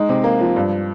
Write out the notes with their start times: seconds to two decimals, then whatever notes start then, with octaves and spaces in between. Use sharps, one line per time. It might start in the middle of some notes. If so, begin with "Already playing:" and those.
Already playing: G#3 D#4
0.09 C3
0.24 A#3
0.41 F3
0.56 G2